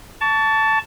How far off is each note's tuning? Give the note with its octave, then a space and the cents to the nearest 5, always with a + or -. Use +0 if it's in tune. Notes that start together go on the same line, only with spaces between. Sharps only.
A5 +0 C#6 +35